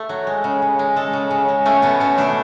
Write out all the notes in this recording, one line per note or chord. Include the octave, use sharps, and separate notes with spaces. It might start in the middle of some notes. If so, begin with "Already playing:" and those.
Already playing: A3
F#3
G#3
C#3
C#3
G#3
G#3 A4
C#3
C#3
G#3
A3 C#4
B2 B3
B2 C#4
A3 D4